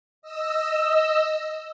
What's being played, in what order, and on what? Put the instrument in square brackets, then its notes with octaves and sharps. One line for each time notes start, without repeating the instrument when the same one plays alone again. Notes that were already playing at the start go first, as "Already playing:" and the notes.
[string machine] D#5 E6